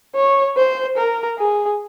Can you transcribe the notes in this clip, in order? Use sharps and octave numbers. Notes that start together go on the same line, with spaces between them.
C#5
C5
A#4
G#4